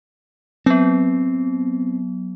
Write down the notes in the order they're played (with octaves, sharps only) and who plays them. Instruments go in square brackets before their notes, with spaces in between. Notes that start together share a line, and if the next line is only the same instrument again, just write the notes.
[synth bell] F#3 B3 [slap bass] C4